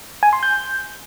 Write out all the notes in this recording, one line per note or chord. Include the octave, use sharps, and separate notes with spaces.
G#5
C6
G6